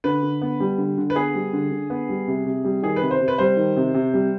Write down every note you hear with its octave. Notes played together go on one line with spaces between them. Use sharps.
D3 B4
D3
B3
G3
D3
D3
B4
B3 G#4
G3
D3
D3
B3
G3
C3
C3
G3
D#3 G#4
B4
C3
C5
C3
B4
G3 C5
D#3
C3
C3
G3